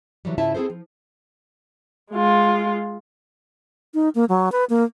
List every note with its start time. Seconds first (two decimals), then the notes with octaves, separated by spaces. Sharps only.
0.25 D3 E3 F#3 G3
0.38 G#2 C#3 E4 F4 E5 A5
0.55 C4 E4 G#4 A4 C5
0.70 F3
2.11 G#3 F4
3.94 D#4
4.15 A#3
4.29 F#3
4.52 B4
4.70 A#3